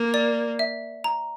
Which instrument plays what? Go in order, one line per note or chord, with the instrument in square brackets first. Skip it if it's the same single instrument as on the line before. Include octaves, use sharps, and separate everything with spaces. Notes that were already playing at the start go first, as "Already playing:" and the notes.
Already playing: [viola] A#3
[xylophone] D5
E5
A#5